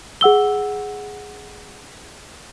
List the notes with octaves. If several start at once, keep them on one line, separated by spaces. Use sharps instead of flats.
G#4 F#5 E6 G7